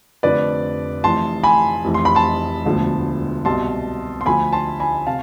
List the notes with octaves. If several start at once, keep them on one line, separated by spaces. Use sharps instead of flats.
F1 F2 D3 F3 B4 D5
F1 F2 E3 A5 C6
G#5 B5
F1 F2 E3
C6
B5
A5 C6
E1 D2 D3 F3
C2 B2 A5 C6
C6
D2 D3 F3 G#5 B5
A5 C6
G#5 B5
C3 F5 A5